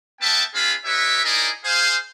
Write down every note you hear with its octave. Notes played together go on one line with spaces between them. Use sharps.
A#3 B3 E5 G5 A5
C4 D4 F4 G#4 F5 B5
D#4 G4 B4 C#5 E5
D#4 E4 G#4 A#4 D5 D#5
G#4 C5 F5